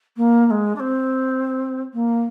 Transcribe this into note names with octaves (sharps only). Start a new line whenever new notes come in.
A#3
A#3
G#3
D4
C4
A#3